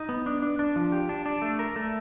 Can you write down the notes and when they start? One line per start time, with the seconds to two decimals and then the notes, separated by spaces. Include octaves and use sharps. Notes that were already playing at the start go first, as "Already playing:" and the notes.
Already playing: D#4
0.09 B3
0.26 D4
0.42 D4
0.59 D4
0.76 F3
0.92 G4
1.09 D4
1.26 D4
1.42 A3
1.59 A#4
1.76 A3